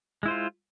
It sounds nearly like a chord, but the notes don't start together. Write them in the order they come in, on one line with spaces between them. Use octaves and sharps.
G#3 E4 C5 F4